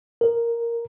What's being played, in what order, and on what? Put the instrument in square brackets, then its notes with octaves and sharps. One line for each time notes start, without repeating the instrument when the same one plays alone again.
[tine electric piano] A#4